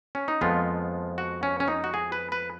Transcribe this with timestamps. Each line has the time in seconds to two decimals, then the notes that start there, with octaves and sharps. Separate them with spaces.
0.15 C#4
0.28 D#4
0.41 F2 F3 G#3 B3 F4
1.18 F#4
1.43 C#4
1.60 C#4
1.68 D#4
1.84 F#4
1.94 G#4
2.12 B4
2.32 B4